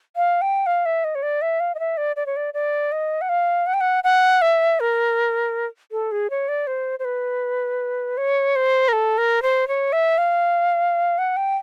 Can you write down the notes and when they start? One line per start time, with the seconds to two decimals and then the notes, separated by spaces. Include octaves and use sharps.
0.16 F5
0.42 G5
0.66 F5
0.86 E5
1.04 D#5
1.15 C#5
1.23 D5
1.42 E5
1.60 F5
1.75 D#5
1.80 E5
1.97 D5
2.16 D5
2.26 C#5
2.37 D5
2.54 D5
2.92 D#5
3.21 F#5
3.29 F5
3.67 F#5
3.74 G5
3.81 F#5
4.04 F#5
4.42 E5
4.80 A#4
5.92 A4
6.12 G#4
6.30 C#5
6.48 D5
6.67 C5
6.99 C5
7.05 B4
8.17 C#5
8.56 C5
8.88 A#4
8.93 A4
9.18 A#4
9.43 C5
9.68 C#5
9.93 E5
10.18 F5
11.18 F#5
11.37 G5